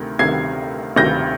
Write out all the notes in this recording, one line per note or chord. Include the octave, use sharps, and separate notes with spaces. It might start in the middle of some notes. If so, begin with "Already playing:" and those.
Already playing: D2 C3 D#3
D2 C3 D#3 G#6 C7
D2 C3 D#3 G6 A#6